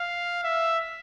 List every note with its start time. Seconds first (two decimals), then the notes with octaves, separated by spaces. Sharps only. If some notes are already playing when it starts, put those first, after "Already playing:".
Already playing: F5
0.44 E5